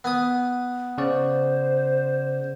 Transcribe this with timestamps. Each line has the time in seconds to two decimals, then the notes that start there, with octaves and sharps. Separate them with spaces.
0.04 B3 G#5 D#6
0.98 C#3 C5 D5